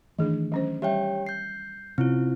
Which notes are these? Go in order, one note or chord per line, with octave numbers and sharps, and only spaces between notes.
D#3 E3 A3 D4 G#4 D#5
F#3 C#4 C5
G3 G4 C#5 E5 G5
G6 C7
C3 C4 C#4 E4 F4